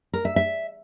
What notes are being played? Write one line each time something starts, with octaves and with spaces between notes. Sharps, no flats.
A#4
E5
E5